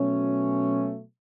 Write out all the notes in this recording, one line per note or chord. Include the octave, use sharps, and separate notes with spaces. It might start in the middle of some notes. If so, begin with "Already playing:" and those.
Already playing: B2 F#3 A3 C#4